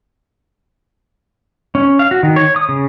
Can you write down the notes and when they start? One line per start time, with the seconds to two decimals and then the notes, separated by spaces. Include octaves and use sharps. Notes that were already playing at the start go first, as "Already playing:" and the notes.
1.75 C#4
1.99 F5
2.11 F#4
2.23 D#3
2.36 C#5
2.56 D#6
2.69 C#3